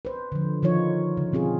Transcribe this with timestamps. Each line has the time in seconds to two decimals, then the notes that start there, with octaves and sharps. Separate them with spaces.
0.05 B4 C5
0.32 D3 F3
0.63 D#3 F3 D#4 F4 C#5
1.17 C#3
1.32 B2 C4 F4 G#4